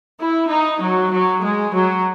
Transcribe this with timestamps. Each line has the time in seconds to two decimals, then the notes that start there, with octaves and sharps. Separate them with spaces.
0.18 E4
0.49 D#4
0.80 F#3
1.11 F#3
1.42 G#3
1.73 F#3